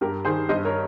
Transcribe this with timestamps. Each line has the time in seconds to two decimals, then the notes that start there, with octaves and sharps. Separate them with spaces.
0.01 G2 G4 A#4
0.25 D#3 G#4 C5
0.49 G2 C5 D#5
0.65 A#4 C#5